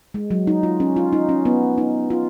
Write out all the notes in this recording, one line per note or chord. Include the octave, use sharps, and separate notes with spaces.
G#3
F#3
D#4
F4
C#4
F4
D#4
C#4
B3
D#4
F4